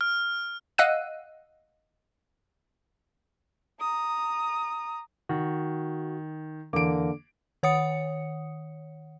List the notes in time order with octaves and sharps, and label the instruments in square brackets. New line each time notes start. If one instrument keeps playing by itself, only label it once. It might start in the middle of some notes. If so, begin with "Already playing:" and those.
[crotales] F6
[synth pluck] D#5 F5 F#5 E6 F#6 D#7
[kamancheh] A#5 D#6
[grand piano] D#3 [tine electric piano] F#4
[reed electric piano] E2 E3 [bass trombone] D3 [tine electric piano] A#3 [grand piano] D6 D7
[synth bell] D#3 C#5 F#5 D#6 C#7